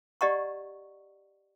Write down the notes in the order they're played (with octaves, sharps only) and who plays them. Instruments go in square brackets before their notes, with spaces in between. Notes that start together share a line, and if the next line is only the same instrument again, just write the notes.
[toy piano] G4 D5 D#5 F#5 A#5 C#6